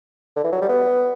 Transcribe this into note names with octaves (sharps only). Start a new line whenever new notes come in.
D3
E3
F#3
G3
B3